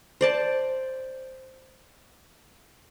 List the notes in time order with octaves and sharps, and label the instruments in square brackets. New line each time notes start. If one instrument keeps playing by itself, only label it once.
[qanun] C5 D5 A5